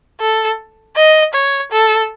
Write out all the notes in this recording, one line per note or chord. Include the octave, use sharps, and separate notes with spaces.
A4
D#5
C#5
A4